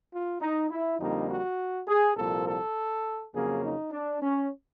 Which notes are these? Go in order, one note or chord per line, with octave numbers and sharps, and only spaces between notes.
F4
D#4
E4
F2 D3 G3 A#3 D#4
F#4
G#4
C2 A#2 F3 A#3 A4
A4
F2 C#3 F#3 A#3 G#4
D#4
D4
C#4